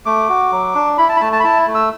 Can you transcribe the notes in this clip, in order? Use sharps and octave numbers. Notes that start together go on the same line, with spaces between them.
A3 D6
F#4
F#3
D4
E4 B5
A5
B5
A3 A5
A5
B5
E4 A5
A3
E6